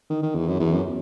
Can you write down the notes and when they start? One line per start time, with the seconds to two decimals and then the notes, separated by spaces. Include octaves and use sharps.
0.10 D#3
0.23 D#3
0.35 E2
0.48 F#2
0.60 E2
0.73 F#2